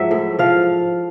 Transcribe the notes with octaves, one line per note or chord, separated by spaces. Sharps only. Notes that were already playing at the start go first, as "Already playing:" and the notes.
Already playing: G#2 F3 F#3 E5
A2
F3 F5